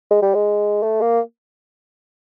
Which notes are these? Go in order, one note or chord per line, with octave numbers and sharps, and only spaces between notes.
G#3
G3
G#3
A3
A#3